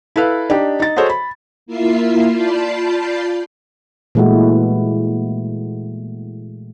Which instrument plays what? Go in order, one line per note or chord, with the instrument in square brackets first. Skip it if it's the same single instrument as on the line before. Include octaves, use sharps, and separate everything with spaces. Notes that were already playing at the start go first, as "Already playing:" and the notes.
[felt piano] E4 A4 B4 F5
D4 D#4 G4
D#4 A6
F#4 G#4 A4 C5 C#5 D#5
B5
[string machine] A#3 E4 F4 E5 C7
F4 D5 A5 B5 G6 C7
[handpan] A#2 E3 G#3 A3 E4 F#4